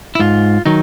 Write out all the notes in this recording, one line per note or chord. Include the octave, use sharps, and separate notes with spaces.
E4
G#2 F4
D#3 F#3 D#4